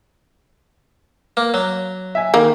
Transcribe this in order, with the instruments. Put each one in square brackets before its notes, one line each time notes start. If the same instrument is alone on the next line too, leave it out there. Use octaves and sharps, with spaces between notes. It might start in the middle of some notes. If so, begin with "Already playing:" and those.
[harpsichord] A#3
F#3
[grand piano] E5 G#5
[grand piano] D#3 [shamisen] A#3